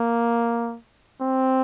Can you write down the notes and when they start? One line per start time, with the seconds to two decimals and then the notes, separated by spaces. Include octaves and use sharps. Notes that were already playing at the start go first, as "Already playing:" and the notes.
Already playing: A#3
1.22 C4